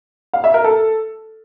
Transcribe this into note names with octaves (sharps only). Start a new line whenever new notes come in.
F5
E5
A#4
A4